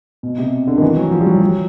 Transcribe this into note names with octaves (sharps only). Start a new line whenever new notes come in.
B2
C3
D3
D#3
E3
F#3
F3
G3
F#3
F#3